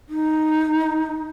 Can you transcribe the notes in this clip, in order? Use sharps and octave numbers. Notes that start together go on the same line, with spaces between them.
D#4